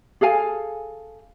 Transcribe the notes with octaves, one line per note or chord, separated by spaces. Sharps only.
G#4 A4 F5 G#5